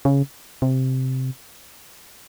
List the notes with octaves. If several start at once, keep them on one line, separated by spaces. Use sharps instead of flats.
C#3
C3